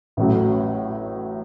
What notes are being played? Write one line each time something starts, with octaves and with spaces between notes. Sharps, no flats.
A1 A2 F#3